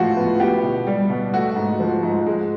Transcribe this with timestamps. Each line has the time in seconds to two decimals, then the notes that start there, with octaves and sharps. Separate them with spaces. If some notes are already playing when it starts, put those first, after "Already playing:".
Already playing: A2 F3 G#3 F4 F#4
0.17 B3
0.40 B3 G4
0.63 B2
0.87 G3
1.10 B2
1.33 A3 F#4
1.56 G#2
1.80 F3
2.03 G#2
2.27 G#3